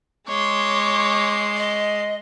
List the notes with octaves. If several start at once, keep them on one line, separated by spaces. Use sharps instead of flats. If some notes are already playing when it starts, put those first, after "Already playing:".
G#3 C#5 C6 D6
D#5